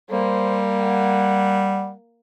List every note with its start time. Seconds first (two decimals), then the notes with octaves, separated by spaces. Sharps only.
0.11 G3 A#3 C5
0.81 F#5